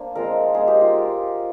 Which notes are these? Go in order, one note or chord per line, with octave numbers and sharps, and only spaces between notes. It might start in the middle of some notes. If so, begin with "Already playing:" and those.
Already playing: A#3 D4 C5
G#3 C4 F4 A#4
G#3 D#4 G#4
G4
F4